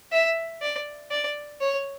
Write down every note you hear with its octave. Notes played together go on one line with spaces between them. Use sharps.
E5
D5
D5
C#5